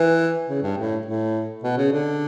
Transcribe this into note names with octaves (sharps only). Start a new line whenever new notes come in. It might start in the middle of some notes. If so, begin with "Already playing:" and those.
Already playing: E3
C#3
G2
A2
A2
B2
C#3
D3